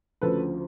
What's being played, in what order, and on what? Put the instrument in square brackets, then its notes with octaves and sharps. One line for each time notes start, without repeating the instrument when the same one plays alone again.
[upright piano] D2 C#3 F3 A4 B4